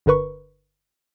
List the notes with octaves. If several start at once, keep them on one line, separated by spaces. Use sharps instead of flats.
G1 D3 A#4 B4 C#6